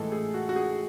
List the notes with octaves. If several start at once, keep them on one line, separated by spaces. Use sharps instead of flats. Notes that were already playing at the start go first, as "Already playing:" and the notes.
Already playing: A2 E3 G#3 A4
G#4
F#4
F#4
G#4